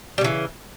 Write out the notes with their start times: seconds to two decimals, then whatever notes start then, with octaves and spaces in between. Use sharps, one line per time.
0.18 G3
0.21 C#3
0.24 E3